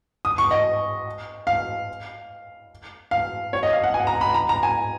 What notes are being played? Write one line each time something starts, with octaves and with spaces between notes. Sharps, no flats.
D#6
C#6
D#5
F5
F5
C#5
D#5
F5
F#5
G#5
A#5
B5
A#5
A#5
G#5